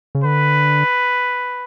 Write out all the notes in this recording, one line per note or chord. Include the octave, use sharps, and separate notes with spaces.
C#3
D3 B4